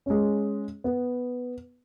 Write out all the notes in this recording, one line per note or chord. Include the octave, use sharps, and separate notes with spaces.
G#3 C#4
B3